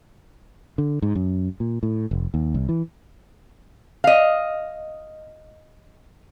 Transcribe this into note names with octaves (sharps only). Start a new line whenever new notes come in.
D3
G#2
F#2
A#2
A2
F1
D#2
C2
E3
D#5 F5